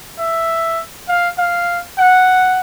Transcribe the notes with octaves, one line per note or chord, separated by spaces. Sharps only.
E5
F5
F5
F#5